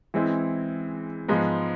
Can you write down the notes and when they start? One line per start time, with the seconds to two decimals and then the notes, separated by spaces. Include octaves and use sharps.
0.14 E3 G#3 C4 E4
1.29 G#2 F3 G#3 B3